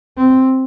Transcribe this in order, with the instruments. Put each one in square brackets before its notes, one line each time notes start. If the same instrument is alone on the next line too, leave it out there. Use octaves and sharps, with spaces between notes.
[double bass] C4